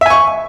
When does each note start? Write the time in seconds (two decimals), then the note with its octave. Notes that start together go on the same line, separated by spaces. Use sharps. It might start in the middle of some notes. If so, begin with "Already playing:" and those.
0.01 E5
0.06 G#5
0.10 C#6